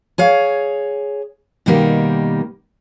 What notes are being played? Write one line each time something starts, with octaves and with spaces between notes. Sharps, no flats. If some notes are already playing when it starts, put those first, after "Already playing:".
G#4 C#5 F5
B2 D#3 G3 A#3 D#4 G4